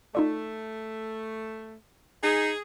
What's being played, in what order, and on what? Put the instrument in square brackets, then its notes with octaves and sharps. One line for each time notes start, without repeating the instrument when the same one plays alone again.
[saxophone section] A3 [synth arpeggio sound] D#4 F4 D5
[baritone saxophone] D#4 [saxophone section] G#4